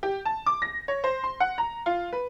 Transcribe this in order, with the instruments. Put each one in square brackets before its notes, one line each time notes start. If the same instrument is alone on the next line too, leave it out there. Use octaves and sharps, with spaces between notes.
[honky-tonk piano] G4
A5
D6
A#6
C#5
C5
C6
F#5
A#5
F4
B4